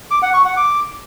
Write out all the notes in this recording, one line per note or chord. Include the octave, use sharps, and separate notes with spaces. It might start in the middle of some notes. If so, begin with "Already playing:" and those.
D6
F#5
C#6
F#5
D6